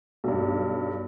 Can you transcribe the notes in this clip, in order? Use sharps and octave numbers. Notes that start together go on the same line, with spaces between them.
B1 G2